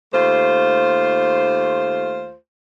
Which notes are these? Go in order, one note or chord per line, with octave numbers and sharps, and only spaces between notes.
D#2 A3 F4 C5